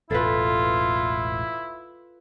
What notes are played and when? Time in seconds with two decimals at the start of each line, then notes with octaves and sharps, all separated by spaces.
0.11 E1 A1 E4 F4 A4 B4